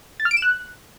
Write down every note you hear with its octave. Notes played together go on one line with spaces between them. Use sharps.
A6
F6
D7
E7
F#6